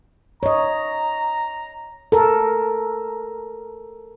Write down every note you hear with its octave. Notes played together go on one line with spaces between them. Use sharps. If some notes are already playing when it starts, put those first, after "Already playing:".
C#5 D#5 A#5
A4 A#4